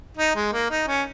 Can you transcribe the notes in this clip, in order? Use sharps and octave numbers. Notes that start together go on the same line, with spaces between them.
D#4
G#3
A#3
D#4
C#4